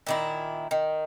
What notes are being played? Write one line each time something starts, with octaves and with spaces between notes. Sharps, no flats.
A#2 D#3 E4
D#3